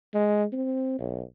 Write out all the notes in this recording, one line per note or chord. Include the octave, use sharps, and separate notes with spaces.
G#3
C4
B1